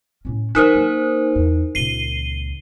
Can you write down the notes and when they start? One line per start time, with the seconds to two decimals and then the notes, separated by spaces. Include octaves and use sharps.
0.25 A2 C#4
0.55 F#3 D#4 A#4 C5
0.74 A#3
1.35 E2
1.75 C#2 A#2 C7 D#7 G7